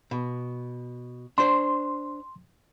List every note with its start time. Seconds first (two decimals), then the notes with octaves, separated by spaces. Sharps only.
0.11 B2
1.38 D4 C5 C6